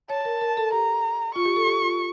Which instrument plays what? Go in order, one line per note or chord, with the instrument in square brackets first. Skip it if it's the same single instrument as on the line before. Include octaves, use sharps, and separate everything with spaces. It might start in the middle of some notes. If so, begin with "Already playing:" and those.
[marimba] C#5 [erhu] A5
[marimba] A#4
A#4
A4
[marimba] G4 [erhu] A#5
[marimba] F4 [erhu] C#6
[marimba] G4
A4
G4
F4